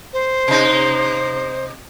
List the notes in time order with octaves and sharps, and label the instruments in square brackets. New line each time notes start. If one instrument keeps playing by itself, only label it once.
[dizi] C5
[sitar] C3 D#4